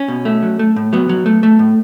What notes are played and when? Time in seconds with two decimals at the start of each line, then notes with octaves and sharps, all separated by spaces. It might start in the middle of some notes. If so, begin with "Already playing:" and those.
Already playing: C#4
0.08 B2
0.25 A3
0.43 F#3
0.59 A3
0.76 A2
0.93 F#3 B3
1.09 F#3
1.26 A3
1.43 A3
1.59 A2